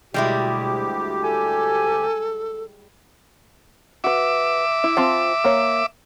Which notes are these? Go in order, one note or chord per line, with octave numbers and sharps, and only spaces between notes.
D2 B2 G3 G#3 E4 G4
A4 G#5
F#4 B4 E5 D6
E4
C4 F4 A5
A#3 C#5